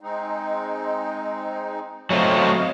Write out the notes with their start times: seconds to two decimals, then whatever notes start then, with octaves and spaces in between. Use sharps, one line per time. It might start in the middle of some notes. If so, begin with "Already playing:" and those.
0.01 G#3 C4 D#4
2.10 F#3 A3 C4 C#5 D#5 F5